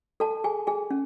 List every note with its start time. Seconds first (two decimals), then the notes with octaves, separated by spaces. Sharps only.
0.20 A4 A5
0.44 G#4 G#5
0.67 G#4 G#5
0.91 C#4